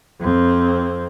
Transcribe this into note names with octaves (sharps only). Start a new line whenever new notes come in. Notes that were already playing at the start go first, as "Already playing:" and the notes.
F2 C4